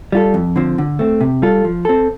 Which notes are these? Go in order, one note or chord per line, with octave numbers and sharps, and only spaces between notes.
G3 F4 A4
F2
D3 F3 C4
D3
A3 C4
C3
G3 F4 A4
F3
C4 A4